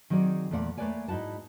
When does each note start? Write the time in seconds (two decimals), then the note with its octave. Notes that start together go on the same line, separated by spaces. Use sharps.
0.10 D#3 F#3 C4 G#4 D5
0.51 E2 A#2 A3 D5 F#5
0.77 A3 A#3 B4 C#5 D5 G#5
1.08 G#2 D#4 E4 F#4 A5